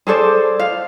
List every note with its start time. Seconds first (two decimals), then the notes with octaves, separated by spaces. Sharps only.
0.07 G#4 A4 C5 D5
0.60 F5